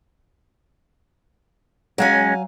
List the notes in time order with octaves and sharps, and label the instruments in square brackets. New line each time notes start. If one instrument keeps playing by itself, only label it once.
[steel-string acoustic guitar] F#3 F5 G#5 [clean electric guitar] G#3 C#4